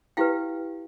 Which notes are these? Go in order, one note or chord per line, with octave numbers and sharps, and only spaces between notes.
E4 G4 B4 F5 G5